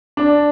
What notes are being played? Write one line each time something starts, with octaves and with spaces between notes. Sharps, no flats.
D4